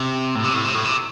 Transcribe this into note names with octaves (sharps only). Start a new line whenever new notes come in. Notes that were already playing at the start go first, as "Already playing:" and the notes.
Already playing: C3
A2
C3
A2
C3
A2
C3